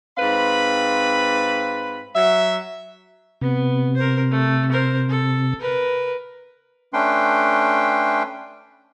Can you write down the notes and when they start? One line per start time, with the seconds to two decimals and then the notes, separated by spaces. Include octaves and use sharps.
0.18 G#2 C4 B4 F5 B5
2.14 F#3 E5
3.41 C3 B3
3.96 A#4 C5
4.31 A3
4.71 A#4 C5
5.09 A4
5.61 A#4 B4
6.93 A3 C#4 D4 B4 G5 C6